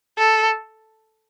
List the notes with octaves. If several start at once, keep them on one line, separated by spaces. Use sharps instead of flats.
A4